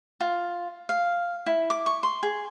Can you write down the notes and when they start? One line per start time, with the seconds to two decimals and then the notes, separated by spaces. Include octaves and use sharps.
0.20 F4
0.89 F5
1.46 E4
1.70 D6
1.86 C#6
2.03 C6
2.23 G#4